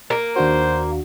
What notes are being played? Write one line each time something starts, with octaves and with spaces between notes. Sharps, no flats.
A#3
D#2 D4 F#4 C5